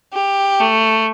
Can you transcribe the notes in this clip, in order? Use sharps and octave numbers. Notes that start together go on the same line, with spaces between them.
G4
A3